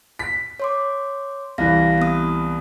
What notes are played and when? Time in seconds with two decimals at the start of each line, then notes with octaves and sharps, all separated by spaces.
0.19 B6
0.60 C#5 C6 D6
1.58 C2 E3 F5 A#6
1.98 B3 D#6